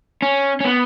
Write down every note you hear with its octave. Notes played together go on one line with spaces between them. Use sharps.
C#4
C#4
B3